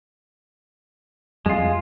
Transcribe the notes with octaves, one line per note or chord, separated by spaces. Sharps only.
F2 G3 G#3 F4